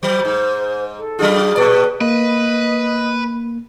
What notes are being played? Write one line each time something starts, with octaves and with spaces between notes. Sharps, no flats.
F#3 C5
G#2
A4
F#3 D4 F4 G#4
A#2 B4 D5
A#3 B4 D#5